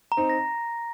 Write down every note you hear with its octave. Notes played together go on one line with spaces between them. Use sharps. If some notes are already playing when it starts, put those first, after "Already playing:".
A#5
C4 D#4
A#6